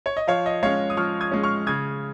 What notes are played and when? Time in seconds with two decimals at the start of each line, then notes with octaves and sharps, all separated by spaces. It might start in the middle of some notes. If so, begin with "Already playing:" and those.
0.06 C#5
0.17 D#5
0.27 F3 C#5 F5
0.46 D#5
0.63 G#3 C#4 C#5 F5
0.90 D#6
0.97 F3 C#6 F6
1.21 D#6 G#6
1.32 G#3 C#4
1.43 C#6 F6
1.66 C#3 D#6 G#6